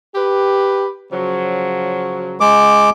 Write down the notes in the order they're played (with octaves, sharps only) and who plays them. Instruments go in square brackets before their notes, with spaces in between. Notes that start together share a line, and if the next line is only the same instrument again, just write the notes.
[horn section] G4 B4
C#3 F3 F#3
[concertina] G#3 D6